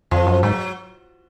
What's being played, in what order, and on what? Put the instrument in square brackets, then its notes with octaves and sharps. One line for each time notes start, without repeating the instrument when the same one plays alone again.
[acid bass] F2 [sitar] F3
[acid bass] F#2
[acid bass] G#2 [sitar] F#3